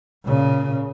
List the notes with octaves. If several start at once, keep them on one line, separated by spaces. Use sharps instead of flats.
A#2 C#3